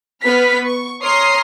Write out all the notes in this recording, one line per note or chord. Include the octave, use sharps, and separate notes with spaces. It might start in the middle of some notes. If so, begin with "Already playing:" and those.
B3 B4 F6 B6
C#6
C#5 A#5 C6 D#6 F6 C7